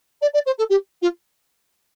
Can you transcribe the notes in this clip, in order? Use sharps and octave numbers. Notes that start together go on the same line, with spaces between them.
D5
D5
C5
A4
G4
F4